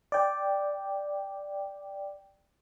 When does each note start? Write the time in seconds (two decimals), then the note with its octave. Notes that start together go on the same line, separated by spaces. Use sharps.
0.12 D5 G5